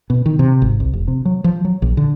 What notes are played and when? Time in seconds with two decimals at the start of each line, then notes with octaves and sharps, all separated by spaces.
0.10 B2
0.26 D#3
0.39 C3
0.62 G#1
0.80 C2
0.93 F1
1.08 C3
1.25 F#3
1.44 F3
1.65 F#3
1.82 A#1
1.97 D3